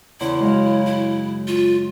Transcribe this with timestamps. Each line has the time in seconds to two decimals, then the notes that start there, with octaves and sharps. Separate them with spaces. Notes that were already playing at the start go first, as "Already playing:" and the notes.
0.20 E2 C#3 E4 C6
0.38 F#2 G#3 F5
0.86 E4
1.48 F4